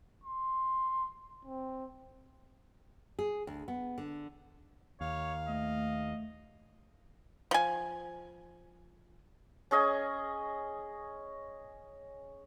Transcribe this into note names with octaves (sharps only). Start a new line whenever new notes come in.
C6
C4
G#4
D2
B3
D3
D#2 C#5 F5
A3 D#5
F3 G#5
C#4 G#4 D#5 G#5